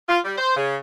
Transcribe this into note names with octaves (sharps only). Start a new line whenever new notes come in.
F4
G3
C5
C#3